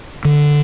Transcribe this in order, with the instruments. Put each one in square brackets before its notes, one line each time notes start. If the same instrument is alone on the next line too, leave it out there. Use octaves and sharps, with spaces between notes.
[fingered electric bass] D3